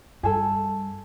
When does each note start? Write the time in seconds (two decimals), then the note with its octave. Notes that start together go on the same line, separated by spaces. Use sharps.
0.23 G2 G#4 A4